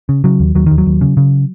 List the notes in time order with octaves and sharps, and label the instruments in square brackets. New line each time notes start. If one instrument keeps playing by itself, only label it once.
[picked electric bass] C#3
C#3 F#3
D#2
D#2 F#3
D#2 D#3
F#3
D#2
C#3
C#3